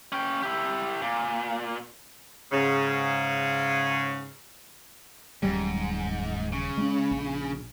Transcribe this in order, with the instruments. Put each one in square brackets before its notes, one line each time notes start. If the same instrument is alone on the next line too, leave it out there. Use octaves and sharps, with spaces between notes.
[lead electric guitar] C#4 G5
E4 G4
A#2
[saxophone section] G#2 C#3
[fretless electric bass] D#1 F#3 G3 [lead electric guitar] G#2
[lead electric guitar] C#3
[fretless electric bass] G#3 C#4
A#1